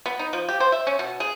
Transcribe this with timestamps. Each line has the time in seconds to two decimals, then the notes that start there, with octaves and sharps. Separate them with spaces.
0.06 B3
0.19 D#4
0.33 F3
0.49 G4
0.60 C5
0.72 E5
0.87 C#4
0.99 B2
1.20 G#4